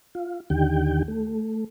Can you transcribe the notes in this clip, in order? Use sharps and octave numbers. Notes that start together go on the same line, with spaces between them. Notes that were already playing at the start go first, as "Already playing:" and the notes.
F4
D#2 D3 D#3 G4 G5
A3